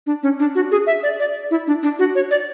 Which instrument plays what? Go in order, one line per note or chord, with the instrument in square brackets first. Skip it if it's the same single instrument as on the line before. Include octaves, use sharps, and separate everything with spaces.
[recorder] D4
C#4
D4
F#4
G#4
E5
D5
D5
E4
D4
D4
F#4
C#5
D5